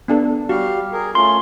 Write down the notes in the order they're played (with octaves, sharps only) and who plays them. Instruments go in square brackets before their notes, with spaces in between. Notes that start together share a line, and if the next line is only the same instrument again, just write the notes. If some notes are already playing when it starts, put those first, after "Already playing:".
[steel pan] B3 D4 A4
[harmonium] G3 G4 F5 [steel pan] F#4
[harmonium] G#4 A#4
[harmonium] A3 C#4 F4 [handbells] C6